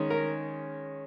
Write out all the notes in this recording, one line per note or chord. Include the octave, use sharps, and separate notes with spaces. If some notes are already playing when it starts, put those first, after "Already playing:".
Already playing: D#3 G#3 C#4
A#4